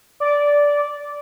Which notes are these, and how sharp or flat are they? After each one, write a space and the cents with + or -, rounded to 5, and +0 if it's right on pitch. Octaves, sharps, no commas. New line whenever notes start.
D5 -10